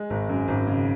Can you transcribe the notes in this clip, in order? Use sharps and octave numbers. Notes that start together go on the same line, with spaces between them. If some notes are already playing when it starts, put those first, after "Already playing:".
Already playing: G#3
G#1
F#2
G#1
C#3